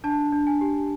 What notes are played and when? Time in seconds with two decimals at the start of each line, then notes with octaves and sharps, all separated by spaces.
0.04 D4 A5
0.33 D4
0.47 G#5
0.61 G4